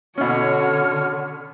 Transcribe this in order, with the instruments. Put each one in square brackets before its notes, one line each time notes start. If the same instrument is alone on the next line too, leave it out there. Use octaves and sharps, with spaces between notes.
[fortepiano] B2 C#4 [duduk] D3 [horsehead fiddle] F#4 C#5 [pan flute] F6